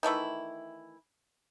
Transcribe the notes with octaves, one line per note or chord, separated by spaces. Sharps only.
D#3 E3 A3 E4